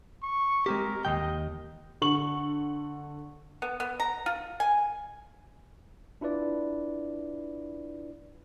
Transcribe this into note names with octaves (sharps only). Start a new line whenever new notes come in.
C#6
G#3 C4 G4 A#4
D#2 D#3 D#5 G5
D3 C#6 F#7
B3
B3
A#5
F4
G#5
D4 E4 F4 B4 D5